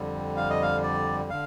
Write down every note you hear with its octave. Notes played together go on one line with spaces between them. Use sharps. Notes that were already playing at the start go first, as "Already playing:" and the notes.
Already playing: F2 D3 G3
F5
D#5
F5
D5
D3 F5